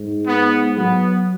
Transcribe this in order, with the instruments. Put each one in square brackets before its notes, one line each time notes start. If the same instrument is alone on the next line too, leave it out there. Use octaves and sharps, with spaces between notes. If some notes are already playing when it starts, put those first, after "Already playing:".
Already playing: [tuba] G#2
[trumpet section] B3
[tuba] F#3 [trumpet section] B3